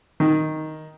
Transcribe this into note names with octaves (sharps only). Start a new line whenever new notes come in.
D#3